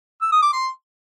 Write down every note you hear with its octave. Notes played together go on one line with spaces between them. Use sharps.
E6
D#6
D6
C6